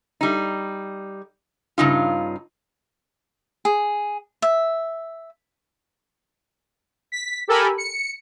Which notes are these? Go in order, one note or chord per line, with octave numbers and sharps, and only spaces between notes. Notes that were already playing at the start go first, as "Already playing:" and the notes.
G3 D#4
G2 C#3 D#4 F4
G#4
E5
B6
G4 A4 A#4 G#5 B5
C#7